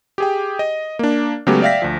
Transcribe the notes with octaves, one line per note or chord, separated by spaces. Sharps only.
G4 G#4 G5
D#5
A#3 D4
C#3 F#3 G#3 A3 B3 G4
D5 E5 F5 G5 A#6 B6
D2 F3